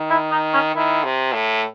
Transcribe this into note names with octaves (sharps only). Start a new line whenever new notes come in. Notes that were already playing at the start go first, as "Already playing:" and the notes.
Already playing: D#3
E4
D#4
C#4
D#3 E4
C3
A2